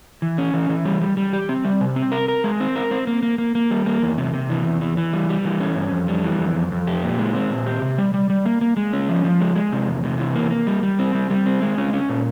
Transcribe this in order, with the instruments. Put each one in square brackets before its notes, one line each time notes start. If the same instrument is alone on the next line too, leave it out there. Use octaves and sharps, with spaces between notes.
[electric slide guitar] E3
C#4
E3
E3
G3
G3
G3
G4
C4
G3
C3
C4
A#4
A#4
G#3
C4
A#4
C4
A#3
A#3
A#3
A#3
G3
A#3
E2
C3
C3
E3
E2
E3
E3
G3
G3
E3
C#4
G2
F2
G3
E3
F2
F2
F2
G4
A#2
G#3
C4
A#2
G4
C3
G3
G3
G3
A#3
A#3
G#3
C#4
F3
F3
G#3
G#3
C3
E2
C3
E3
A#3
A#3
G3
G3
C4
G3
G3
C4
G#3
C#4
C#4
A#2